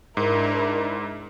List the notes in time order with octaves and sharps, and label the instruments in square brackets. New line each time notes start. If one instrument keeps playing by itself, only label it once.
[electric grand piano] G#2 [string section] D4 E4 A#4